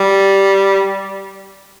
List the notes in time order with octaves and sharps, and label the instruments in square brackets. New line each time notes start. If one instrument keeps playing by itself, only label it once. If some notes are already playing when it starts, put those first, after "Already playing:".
Already playing: [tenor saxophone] G3